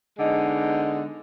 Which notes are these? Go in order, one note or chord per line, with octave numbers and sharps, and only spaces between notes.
D3 G#3 B3 D#4